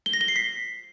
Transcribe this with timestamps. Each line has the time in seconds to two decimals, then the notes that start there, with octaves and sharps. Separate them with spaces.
0.06 G7
0.13 A#6
0.21 G7
0.28 C7
0.36 B6